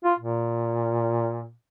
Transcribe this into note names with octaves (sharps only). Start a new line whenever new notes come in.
F4
A#2